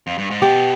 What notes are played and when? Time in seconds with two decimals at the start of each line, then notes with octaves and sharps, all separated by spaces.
0.07 F2
0.18 G2
0.31 G#2
0.42 B2 G4